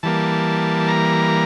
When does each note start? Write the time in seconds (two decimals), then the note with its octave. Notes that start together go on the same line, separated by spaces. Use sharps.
0.03 E3 G3 A#3 A5
0.88 A#5